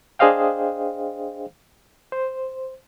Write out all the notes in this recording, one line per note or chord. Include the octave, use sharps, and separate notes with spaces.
D4 G#4 C5 D#5 F5 G5
C5